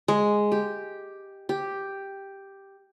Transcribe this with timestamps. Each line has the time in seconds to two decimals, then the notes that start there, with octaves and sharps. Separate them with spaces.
0.08 G#3
0.52 G4
1.49 G4